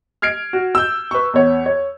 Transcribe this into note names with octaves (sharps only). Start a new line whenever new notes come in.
F6 G#6 C7 D7
F#4
E6 G6
B4 C#6
E2 C#5
C#5